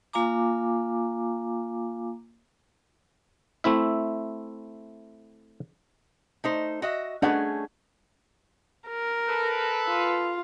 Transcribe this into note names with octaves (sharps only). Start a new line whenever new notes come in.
A#3 F4 F5 G#5 A#5 D6
A3 C4 E4 E5
A3 D#4 C5
F#4 D#5 E5
A3 C#4 D4 G#4 D#5 F#5
A#4
A4 B4
F4